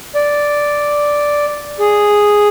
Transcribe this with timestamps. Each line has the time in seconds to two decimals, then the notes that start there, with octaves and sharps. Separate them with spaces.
0.15 D5
1.80 G#4